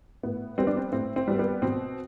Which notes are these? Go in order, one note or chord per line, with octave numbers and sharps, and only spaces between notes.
A2 B3
G3 B3 C4
D4
C4
A2 C4
C4
G3 B3
B3
B2 C4